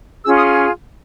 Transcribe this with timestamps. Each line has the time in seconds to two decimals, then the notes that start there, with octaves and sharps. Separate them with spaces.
0.24 C#4 F4 G#4 E6
0.36 D#6